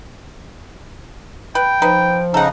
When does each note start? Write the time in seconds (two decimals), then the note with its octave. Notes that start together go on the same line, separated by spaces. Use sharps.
1.55 B4 G5
1.82 F3 D#4 B4
2.34 C#3 D#4 A4 F#5